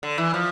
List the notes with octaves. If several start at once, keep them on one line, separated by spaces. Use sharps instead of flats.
D3
E3
F3